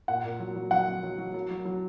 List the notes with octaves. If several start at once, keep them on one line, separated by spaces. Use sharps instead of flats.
A#2 F#5
A#2
F#3
F#3
F#3 F#5
F#3
F#3
F#3
F#3
F#3
F#3